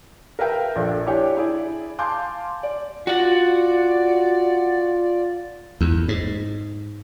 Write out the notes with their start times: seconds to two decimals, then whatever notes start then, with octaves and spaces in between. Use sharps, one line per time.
0.39 A#4 B4 E5 F5 G5
0.76 A#1 D4 A4
1.06 D4 E4 G4 C#5 G5 G#5
1.37 E4 G#4 D5
1.99 F5 G#5 A5 C6 D6 G6
2.63 D5
3.07 F4 F#4 D5 F#5
5.81 E2
6.08 G#2